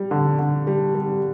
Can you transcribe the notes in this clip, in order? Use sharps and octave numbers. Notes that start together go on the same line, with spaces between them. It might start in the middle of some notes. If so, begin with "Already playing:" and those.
Already playing: G3
D3
D3
G3
G3